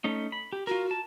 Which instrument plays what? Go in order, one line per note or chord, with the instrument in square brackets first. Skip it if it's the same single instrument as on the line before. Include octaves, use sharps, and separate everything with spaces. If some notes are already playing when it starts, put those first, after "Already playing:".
[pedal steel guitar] A3 C#4 D#4
B5
G4
[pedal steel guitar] F4 A#4 [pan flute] F#4
[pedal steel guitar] A5